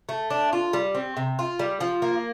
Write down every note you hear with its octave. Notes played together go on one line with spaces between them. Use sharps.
A3
D4
F4
G3
C4
C3
F4
G3
F3
A#3